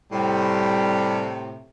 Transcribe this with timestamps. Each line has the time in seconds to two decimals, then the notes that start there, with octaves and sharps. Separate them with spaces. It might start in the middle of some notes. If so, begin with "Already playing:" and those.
0.12 A2 C3 G3